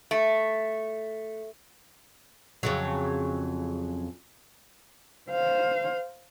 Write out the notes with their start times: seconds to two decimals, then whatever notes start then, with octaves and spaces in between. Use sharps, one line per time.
0.11 A3
2.63 F2 C#3 F#3
5.31 C5 F5